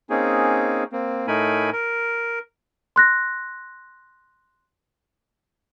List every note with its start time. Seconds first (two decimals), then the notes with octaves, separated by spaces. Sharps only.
0.10 A#3 C4 C#4 D#4 G#4
0.92 A#3 C4
1.27 A2 A3 D#4 A#4 G#5 B5
1.73 A#4
2.96 C6 F#6 A#6